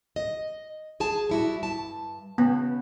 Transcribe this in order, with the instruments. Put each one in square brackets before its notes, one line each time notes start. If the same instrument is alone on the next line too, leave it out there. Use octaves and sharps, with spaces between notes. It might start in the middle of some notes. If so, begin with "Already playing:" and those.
[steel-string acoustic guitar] D#5
G#4 G#5 A5
G3 E4 F#4
G2 A5
[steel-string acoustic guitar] C#3 [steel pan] B3